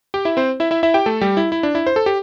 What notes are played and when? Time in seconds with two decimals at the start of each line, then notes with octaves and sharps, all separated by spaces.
0.14 G4 G5
0.25 E4 E5
0.37 C4 C5
0.60 E4 E5
0.71 E4 E5
0.83 E4 E5
0.94 G4 G5
1.06 A3 A4
1.21 G3 G4
1.37 E4
1.52 E4
1.63 D4
1.75 E4
1.87 C5
1.96 A4
2.06 G4